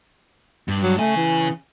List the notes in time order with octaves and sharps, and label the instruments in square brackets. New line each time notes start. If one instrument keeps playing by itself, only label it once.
[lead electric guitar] G2
[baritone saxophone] F#3
[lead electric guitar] C#3 G#5 [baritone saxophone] A3
[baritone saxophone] E3